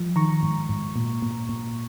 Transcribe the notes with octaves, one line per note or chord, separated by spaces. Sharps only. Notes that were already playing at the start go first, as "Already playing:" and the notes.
Already playing: F3
D#3 A#5 C#6
G#2
G#2
A#2
A#2
A#2